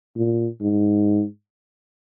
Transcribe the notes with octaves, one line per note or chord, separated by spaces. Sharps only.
A#2
G#2